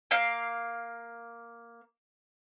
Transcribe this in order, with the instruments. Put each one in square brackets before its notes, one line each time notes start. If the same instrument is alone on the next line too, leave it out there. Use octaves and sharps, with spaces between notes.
[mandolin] A#3 F5